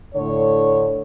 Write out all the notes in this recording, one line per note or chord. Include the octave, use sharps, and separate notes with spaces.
A2 D3 C#5